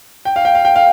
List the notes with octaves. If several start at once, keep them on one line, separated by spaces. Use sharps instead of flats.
G5
F5
G5
F5
G5
F5